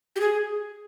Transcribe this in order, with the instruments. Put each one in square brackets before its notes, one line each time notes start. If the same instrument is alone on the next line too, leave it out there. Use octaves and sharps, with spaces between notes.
[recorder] G4
G#4